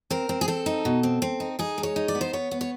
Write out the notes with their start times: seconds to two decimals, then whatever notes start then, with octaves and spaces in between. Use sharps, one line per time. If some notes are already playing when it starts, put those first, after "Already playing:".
0.10 C4 A#4
0.29 C4
0.41 G#4
0.48 C4 A4
0.66 D#4
0.85 B2
1.03 C4
1.22 C4
1.40 D#4
1.59 D#4 G#4
1.78 G#3
1.83 C#5
1.96 D#4
2.08 D5
2.15 B3
2.21 C5
2.33 B3 C#5
2.51 B3
2.61 C#5